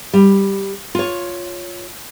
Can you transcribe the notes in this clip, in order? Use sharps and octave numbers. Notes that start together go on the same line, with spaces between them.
G3
F4 C#5